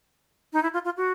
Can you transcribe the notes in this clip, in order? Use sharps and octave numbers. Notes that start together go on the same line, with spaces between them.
D#4
E4
F4
F4
F#4